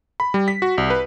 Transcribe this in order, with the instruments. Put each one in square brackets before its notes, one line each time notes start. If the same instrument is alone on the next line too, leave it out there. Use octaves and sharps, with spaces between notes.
[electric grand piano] B5
G3
B6
F#4
C2
B4